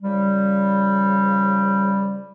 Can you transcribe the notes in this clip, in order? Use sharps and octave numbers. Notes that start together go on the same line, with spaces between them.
C#3 F3 G3